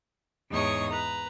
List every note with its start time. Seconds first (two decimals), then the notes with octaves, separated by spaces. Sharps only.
0.50 E2 G#2 D#4 C#5 C#6 D#6
0.90 B4 A#5